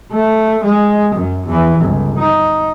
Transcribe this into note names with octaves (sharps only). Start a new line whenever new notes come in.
A3
G#3
F#2
E2 E3
G1 C#2
D#4